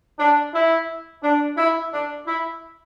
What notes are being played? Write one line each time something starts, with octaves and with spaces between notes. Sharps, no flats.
D4
E4
D4
E4
D4
E4